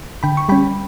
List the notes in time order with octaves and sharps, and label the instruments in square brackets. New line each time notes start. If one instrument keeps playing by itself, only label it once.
[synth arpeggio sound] D3 G5 B5
C#6
G3 C#4 G5 B5